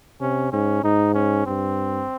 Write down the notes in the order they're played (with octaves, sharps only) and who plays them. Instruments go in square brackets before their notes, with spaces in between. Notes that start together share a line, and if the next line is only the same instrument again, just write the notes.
[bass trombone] C3 [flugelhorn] C#4
[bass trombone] G#2 [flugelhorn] C#4
[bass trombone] G#2 [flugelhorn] D#4
[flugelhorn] C#4
[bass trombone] G2 [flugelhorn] C4